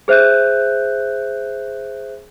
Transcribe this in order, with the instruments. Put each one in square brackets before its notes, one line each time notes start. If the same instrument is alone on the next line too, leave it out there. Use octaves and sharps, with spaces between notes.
[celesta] G#4 C5 E5 F#6 G6